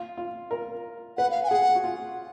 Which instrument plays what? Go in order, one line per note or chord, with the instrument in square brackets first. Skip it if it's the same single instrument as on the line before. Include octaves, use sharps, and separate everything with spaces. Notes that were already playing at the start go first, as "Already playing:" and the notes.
Already playing: [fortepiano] F4
F4
A#4
[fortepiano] B4 [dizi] F#5
[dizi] F5
G#5
[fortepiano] G#4 [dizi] F#5
[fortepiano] F#4
F4